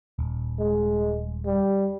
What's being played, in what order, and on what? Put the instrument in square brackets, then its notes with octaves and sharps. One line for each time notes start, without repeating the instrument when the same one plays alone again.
[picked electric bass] D#1
[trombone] G#3
G3